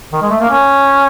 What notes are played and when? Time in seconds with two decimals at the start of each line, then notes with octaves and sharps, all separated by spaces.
0.13 D#3
0.22 G#3
0.30 A3
0.41 A#3
0.50 C#4